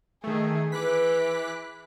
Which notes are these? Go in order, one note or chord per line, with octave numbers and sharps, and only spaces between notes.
D#3 A3 G#4
E3 B4 D6 F#6 B6